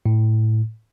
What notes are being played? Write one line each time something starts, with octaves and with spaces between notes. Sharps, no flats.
A2